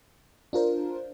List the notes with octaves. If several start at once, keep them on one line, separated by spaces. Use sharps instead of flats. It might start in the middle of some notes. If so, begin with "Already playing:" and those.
D4 F4 A#4 C5